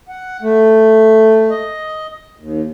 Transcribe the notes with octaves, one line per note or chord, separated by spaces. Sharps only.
F#5
A3
D#5
D#2